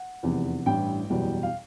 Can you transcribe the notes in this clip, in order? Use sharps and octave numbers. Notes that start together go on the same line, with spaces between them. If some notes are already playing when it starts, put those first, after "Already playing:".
Already playing: F#5
F1 E2 C3
A1 G2 E3 G3 G5
F#1 E2 B2 G3
F5